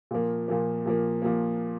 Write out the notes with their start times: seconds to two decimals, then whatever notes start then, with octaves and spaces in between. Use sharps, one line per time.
0.11 A#2 F3 A#3
0.48 A#2 F3 A#3
0.86 A#2 F3 A#3
1.22 A#2 F3 A#3